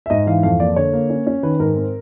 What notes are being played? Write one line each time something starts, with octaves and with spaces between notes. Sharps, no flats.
E5
G#2 D#5
E3 F5
F2 F5
A#3 D5
D3 C#5
A#3
C#4
C#4
D#3 B4
G#2 A#4
C4